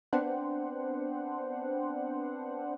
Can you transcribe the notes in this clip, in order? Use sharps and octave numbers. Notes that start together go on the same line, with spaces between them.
B3 C4 D4 C5 F#5